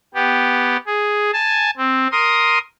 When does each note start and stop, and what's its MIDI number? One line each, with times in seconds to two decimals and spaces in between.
0.14 0.77 59
0.14 0.77 67
0.87 1.31 68
1.33 1.71 80
1.33 1.71 81
1.77 2.07 60
2.12 2.58 70
2.12 2.58 84
2.12 2.58 87